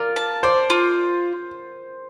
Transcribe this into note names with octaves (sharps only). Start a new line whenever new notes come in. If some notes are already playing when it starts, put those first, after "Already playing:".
Already playing: F4 A#4 D5
A5
C5 D5
F4